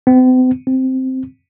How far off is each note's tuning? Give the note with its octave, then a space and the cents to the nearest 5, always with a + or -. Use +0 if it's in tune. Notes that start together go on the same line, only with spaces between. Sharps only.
C4 -45
C4 -5